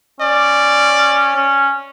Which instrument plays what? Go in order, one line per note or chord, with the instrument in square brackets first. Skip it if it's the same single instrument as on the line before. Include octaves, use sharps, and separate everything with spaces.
[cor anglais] C#4 [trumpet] D5
[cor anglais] C#4